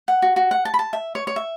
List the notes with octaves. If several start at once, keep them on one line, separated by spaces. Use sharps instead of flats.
F#5
F#4
F#4
F#5
A5
B5
A5
E5
C#5
C#5
E5